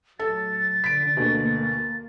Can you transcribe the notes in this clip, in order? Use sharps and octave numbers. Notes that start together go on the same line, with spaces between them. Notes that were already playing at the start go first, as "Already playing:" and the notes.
A2 F#3 A4 A6
D3 F3 B6 D7
D2 B2 A#3